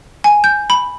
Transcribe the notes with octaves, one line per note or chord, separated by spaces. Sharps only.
G#5
G6
B5